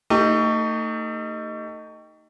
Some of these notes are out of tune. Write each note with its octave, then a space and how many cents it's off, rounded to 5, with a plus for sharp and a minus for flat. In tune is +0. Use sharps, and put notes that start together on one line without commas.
A3 +35 D#4 +0 G4 +0